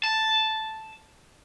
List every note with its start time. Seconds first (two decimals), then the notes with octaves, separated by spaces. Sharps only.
0.04 A5